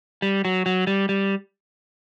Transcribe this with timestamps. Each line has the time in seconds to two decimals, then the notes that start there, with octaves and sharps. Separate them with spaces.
0.22 G3
0.45 F#3
0.66 F#3
0.87 G3
1.09 G3